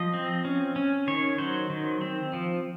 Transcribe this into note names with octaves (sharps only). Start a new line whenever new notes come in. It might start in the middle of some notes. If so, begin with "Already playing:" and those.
Already playing: F3 D#5
C4
C#4
C#4
D#3 C#5
F#3 C5
D#3
C4
F3